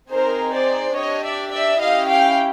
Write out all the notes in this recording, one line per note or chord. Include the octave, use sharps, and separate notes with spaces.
C4 D#4 G#4 A#4 C5
C5 D5
D4 G4 C#5 D#5
D5 E5
D5 E5
C#4 E4 G4 D#5 F5
F5 G5